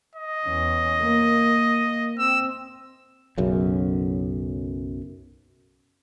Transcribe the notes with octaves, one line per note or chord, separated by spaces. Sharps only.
D#5
E2 C#4
A#3
A#3
C4 E6
B1 F#2 C#3